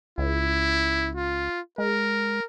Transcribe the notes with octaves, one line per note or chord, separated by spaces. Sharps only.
C#2 E4
F4
G#3 A#4